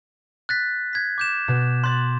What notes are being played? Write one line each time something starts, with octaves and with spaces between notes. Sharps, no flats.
F#6 A6 B6
G6 G#6 B6
D6 G6 E7
B2
C6 F#6 A6